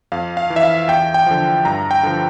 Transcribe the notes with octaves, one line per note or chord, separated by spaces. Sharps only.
F2 F5
F5
E3
E5
F5
E2 G5
G5
D3 F3
G2 A#5
G5
D3 F3